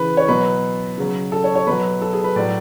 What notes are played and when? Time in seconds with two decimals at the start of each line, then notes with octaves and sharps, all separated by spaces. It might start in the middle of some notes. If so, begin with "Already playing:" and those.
Already playing: C#3 E3 B4
0.17 C#5
0.28 B2 F#3 B4
0.98 C#3 F#3
1.32 A4
1.44 C#5
1.55 C#5
1.66 B2 F#3 B4
2.02 A4
2.13 G#4
2.24 B4
2.36 A2 F#3 D5